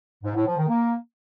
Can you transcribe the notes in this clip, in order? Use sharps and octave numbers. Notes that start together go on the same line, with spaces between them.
G#2
A2
F3
D#3
A#3